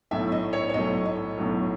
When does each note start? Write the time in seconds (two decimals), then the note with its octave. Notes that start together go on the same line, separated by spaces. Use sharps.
0.11 B1 A2 F#3 A3 E5
0.32 D#5
0.53 C#5
0.69 C#5
0.74 B1 A2 F#3 A3 D#5
1.05 D#5
1.38 B1 A2 F#3 A3